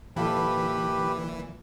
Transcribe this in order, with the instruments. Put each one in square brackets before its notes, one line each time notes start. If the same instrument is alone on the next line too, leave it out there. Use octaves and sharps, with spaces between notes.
[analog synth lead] A#2 [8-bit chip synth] E3 [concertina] G4 B4 B5 [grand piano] A4 F5 A5